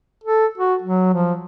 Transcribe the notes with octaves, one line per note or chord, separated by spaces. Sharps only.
A4
F#4
F#3
F3